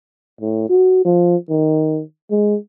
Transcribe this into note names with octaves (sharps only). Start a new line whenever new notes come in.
A2
F#4
F3
D#3
G#3